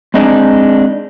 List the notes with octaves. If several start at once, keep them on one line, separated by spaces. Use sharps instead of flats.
G#3 C4 D4 D#4 G#4 D5